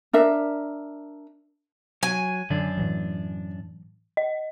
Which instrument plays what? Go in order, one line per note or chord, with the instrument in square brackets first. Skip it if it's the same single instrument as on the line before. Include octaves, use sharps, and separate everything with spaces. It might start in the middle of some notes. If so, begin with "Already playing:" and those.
[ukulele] D4 A#4 E5
[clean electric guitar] F#3 [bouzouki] G#5
[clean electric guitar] F#2 D4 [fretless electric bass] D3
[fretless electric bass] A2 E3 F#3
[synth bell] D#5